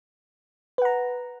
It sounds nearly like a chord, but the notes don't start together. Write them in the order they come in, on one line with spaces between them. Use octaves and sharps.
B4 F#5 A#5